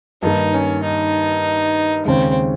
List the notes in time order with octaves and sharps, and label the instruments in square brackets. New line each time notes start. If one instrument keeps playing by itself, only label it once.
[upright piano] G2 D#3 A#3 [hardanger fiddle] D#4
[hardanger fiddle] C#4
D#4
[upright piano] D#2 C#3 G#3 [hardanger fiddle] C4